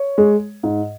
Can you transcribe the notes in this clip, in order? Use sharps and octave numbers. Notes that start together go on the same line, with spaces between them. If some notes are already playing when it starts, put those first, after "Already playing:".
Already playing: C#5
G#3
G#2